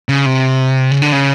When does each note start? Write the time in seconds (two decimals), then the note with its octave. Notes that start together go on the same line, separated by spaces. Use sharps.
0.09 C#3
0.26 C3
0.91 C#3
1.02 D3
1.12 C#3